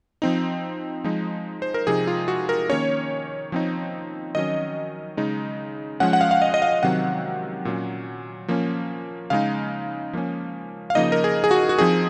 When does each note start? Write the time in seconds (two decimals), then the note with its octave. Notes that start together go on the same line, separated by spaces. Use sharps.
0.22 F3 C4 D#4
1.04 F3 G#3 D#4
1.62 C5
1.74 A#4
1.87 C3 F3 C4 D#4 G#4
2.07 F4
2.28 F#4
2.49 A#4
2.69 D#3 A#3 C#4 C#5
3.52 F3 C4 D#4
4.35 D#3 F#3 C#4 D#5
5.17 C#3 G#3 D#4
6.00 F3 G#3 C#4 F#5
6.13 F#5
6.21 F5
6.31 F5
6.42 D#5
6.54 D#5
6.62 F5
6.83 C3 D#3 F#3 C4 F#5
7.65 A#2 F#3 C#4
8.48 F3 A#3 C#4
9.30 C#3 G#3 D#4 F5
10.13 F3 A#3 C#4
10.90 F5
10.95 C#3 F3 A#3 D#4 D#5
11.12 A#4
11.24 G#4
11.44 G#4
11.51 F#4
11.69 F#4
11.78 F3 C4 D#4 G#4